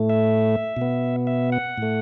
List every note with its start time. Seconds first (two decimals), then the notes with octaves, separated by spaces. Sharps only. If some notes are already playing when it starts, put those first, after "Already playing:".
Already playing: A2 A3
0.09 E5
0.77 B2 B3
1.27 E5
1.52 F#5
1.78 A2 A3